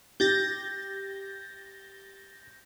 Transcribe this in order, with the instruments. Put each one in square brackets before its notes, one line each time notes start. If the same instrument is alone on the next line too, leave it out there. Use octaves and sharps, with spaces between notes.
[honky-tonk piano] G4 [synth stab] G6 A6 A#6